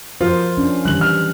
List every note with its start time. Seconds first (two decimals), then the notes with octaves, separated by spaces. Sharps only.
0.21 F3 F4 A#4 C5
0.57 C#4 D4
0.85 D#3 E3 G3 F#6 F#7
1.01 F6